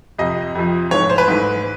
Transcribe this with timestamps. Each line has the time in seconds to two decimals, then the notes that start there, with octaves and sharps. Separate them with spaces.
0.18 F2 C3 F3 D#5
0.55 F2 C3 F3
0.91 G#2 E3 A3 C#5
1.10 C5
1.18 B4
1.28 G#2 E3 A3